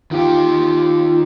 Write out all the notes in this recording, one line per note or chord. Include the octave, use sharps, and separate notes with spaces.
D#3 F4 G4